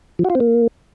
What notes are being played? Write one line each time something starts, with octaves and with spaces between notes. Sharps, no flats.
F3
F#4
F4
C4
A#3